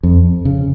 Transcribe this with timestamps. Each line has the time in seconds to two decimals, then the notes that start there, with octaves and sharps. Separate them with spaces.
0.03 F2
0.45 C#3